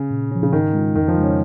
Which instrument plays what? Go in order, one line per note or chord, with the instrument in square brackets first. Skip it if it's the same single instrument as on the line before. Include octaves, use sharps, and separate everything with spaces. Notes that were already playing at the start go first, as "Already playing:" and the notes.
Already playing: [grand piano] C#3
[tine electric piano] A#2
F3 C#4
[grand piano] C#3
[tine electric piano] G#2 [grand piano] D#3
[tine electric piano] G#3 F4
[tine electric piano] F2 [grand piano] D#3
[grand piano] F3
[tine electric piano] C#3 G#3
[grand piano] C#4